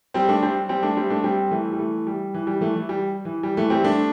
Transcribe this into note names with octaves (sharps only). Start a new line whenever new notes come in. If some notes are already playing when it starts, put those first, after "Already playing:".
G3 C4
A3 D4
G3 C4
G3 C4
A3 D4
G3 C4
A3 D4
G3 C4
E3 A3
G3
E3 A3
G3
E3
G3
E3 A3
E3
G3
E3
G3
E3 A3
G3 C4
A3 D4